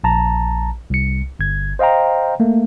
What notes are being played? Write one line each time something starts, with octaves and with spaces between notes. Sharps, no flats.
A#1 A5 A#5
C2 C#7
G1 G#6
C5 D#5 F5 G5 A#5
A3 A#3